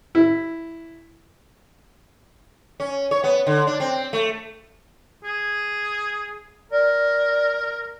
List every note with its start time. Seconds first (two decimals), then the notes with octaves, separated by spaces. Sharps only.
0.15 E4
2.80 C#4
3.11 C#5
3.24 B3
3.47 D3
3.67 D4
3.80 C4
4.13 A3
5.24 G#4
6.72 A#4 D5